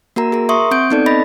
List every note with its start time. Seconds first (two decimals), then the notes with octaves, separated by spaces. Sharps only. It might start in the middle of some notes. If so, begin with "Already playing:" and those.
0.16 A#3 F#4 A#4 A#5
0.32 G#4 A#4 A#5
0.49 E5 C6 C#6 D#6
0.71 C4 G6 D7
0.90 B3 C4 D#4 A4 D5
1.06 D#5 B5 A6 A#6